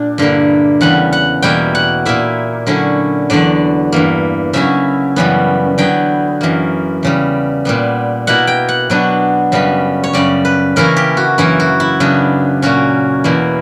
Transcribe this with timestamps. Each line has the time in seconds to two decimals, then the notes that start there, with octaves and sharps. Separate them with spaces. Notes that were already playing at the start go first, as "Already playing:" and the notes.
Already playing: A#2 D4
0.18 G2 D3 A#3 E4
0.81 E2 C#3 G3 F#5
1.13 F#5
1.42 E2 B2 G3 A#3 E4 G5
1.75 F#5
2.05 A#2 A#3 E4 E5
2.67 D3 F#3 C#4 E4
3.30 E2 D3 F#3 D5
3.92 G2 E3 A#3
4.53 C#3 F#3 C#4 E4 E5
5.16 F#2 C#3 E3 G3 B3
5.78 D3 F#3 B3 E4 G5
6.41 F#2 E3 A#3
7.03 E2 C#3 G3
7.65 A#2 G3 B3
8.27 B2 A#3 E4 F#5
8.47 G5
8.69 F#5
8.90 B2 F#3 B3 D4
9.52 F#2 C#3 G3 B3
10.04 C#5
10.13 F#2 C#3 G3 D5
10.45 B4
10.76 C#3 E3 A#3 C#4 E4 A#4
10.96 G4
11.17 F#4
11.38 F#2 E3 A#3 E4
11.60 F#4
11.80 E4
12.00 C#3 F#3 B3 D4
12.62 A#2 A#3 C#4 F#4
13.24 E2 B2 A#3 E4